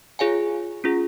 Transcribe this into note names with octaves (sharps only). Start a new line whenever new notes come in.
F4 G#4 C#5 F5 G#5
C#4 F4 G#4